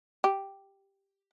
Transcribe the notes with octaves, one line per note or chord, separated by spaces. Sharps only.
G4